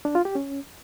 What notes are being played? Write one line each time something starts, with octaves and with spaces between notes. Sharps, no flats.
D4
F4
G4
C#4